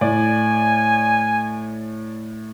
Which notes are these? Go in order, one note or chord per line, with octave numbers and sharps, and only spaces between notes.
A2 D5 G#5